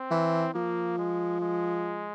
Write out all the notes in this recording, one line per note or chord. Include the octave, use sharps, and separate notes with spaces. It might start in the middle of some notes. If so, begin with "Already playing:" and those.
Already playing: C4
E3
F3 A#3
G#3
G#3